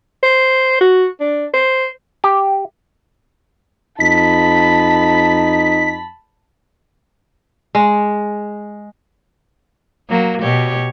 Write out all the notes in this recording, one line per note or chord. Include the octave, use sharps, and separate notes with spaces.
C5
F#4
D4
C5
G4
F2 D#4 A5 B5 B6
G#3
F#3 A#3
B2 G4 C#5